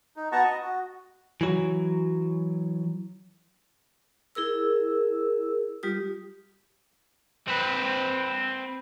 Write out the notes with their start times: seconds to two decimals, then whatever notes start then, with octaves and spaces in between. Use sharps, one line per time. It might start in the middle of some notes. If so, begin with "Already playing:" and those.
0.16 D#4
0.32 B3 F#4 F#5 A5 A#5 C#6
0.44 D#5
0.62 F#4
1.41 E3 F#3
4.35 E4 G#4 A#4 E6
5.83 G3 F4 G4 D#6
7.48 C4 B4